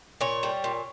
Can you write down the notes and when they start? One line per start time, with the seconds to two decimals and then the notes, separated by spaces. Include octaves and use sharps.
0.21 A#2 C#5
0.43 G3
0.64 A#2